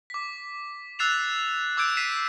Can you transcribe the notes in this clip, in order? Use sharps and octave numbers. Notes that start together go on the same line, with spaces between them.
D6 B6
E6 F#6 A6 C7 E7 F7
D6 E6 G6 G#6 D7
B6 C7 D#7 E7